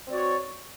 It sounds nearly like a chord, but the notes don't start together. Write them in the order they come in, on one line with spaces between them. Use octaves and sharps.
C4 D5 F#4 C#5